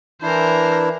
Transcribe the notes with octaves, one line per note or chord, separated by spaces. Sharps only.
E3 D4 E4 A#4 C5